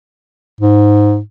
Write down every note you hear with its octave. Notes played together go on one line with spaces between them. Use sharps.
G#2